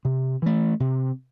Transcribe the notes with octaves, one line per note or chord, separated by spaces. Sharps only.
C3
E3 A3
C3